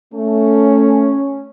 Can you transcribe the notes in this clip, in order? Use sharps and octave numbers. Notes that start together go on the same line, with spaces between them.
A3 C#4